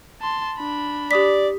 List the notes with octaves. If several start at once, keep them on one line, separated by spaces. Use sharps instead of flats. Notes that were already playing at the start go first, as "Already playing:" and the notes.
A5 C6
D4 B5
G4 D5 D#6 B6